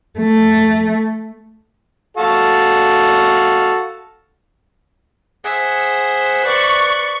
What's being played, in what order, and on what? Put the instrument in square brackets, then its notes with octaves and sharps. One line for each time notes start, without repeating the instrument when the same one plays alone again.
[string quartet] A3
[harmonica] F#4 A4 F5
[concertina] G#4 F#5 [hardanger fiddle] C5 E5
[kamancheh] B4 D5 [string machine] C#6 [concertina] F#6